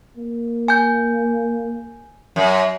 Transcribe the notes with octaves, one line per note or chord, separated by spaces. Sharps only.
A#3
G#5 G6
F#2